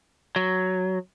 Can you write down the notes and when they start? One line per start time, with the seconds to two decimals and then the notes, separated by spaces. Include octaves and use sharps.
0.36 F#3